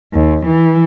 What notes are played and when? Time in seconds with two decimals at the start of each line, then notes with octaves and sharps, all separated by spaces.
0.14 D#2
0.47 E3